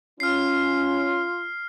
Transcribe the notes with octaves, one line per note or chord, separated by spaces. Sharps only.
C#4 F4 F6 C7